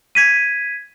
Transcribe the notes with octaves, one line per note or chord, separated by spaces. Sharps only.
G#6 B6 D#7